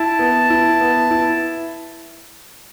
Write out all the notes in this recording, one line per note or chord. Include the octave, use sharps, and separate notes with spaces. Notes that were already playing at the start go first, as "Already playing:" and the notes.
Already playing: E4 A5
B3
E4
B3
E4